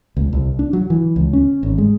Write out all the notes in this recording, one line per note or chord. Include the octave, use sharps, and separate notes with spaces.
C#2
C2
D4
F#3
E3
C#2
C#4
G#1
G#3